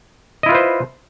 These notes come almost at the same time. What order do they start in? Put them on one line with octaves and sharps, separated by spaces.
D#5 E4 F4 B4 C5